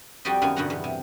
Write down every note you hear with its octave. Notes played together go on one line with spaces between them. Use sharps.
F2 G3 F#4 G4 D5 D#5
F#2 D#3 B3 F5 G#5
G2 B2 D3 D#4 F#5 A#5
E2 B3
C3